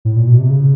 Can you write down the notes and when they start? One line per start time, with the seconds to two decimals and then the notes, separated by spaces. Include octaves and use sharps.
0.05 A2
0.16 A#2
0.27 B2
0.39 C3
0.50 C#3